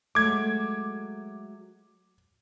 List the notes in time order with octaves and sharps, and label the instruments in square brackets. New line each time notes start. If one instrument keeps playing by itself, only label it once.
[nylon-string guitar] F#3 G#3 A3 [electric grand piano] D6 G#6